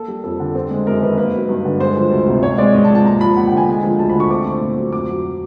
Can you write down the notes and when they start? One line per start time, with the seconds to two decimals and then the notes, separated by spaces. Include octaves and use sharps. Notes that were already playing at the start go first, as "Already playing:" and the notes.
Already playing: A#3 A4
0.08 G3
0.24 F2 A4
0.40 D3
0.55 C4
0.71 G#3
0.86 F#2 A#4
1.02 D#3 B4
1.18 A#3 B4
1.33 F#3
1.49 G2
1.65 D3
1.80 G#3 C5
1.96 F3
2.11 D2
2.27 C3
2.43 G#2 C#5
2.58 G#3 D5
2.74 G#2 D#5
2.84 A5
2.90 F3
2.95 A5
3.05 D#2 A#5
3.21 F3 B5
3.36 D#2 F#5
3.47 G5
3.52 D3
3.57 G#5
3.68 G#3
3.83 F3
3.99 D2 A5
4.09 B5
4.15 D3
4.20 C#6
4.30 C4 D6
4.46 A3
4.61 A#2
4.77 F#3
4.93 F2 D6
5.09 F#3